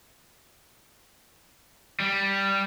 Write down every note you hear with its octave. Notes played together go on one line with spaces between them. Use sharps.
G3